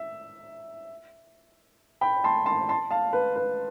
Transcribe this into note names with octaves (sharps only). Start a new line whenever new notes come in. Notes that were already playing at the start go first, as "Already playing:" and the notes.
Already playing: E5
G5 B5
A5 C6
A5 C6
A5 C6
F5 A5
B4
B4